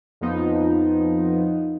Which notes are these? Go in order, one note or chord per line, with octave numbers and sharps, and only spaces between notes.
F2 F3 B3 D#4